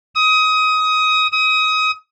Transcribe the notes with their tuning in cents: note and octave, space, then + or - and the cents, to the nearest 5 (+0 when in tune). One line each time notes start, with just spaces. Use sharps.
D#6 +20
D#6 +25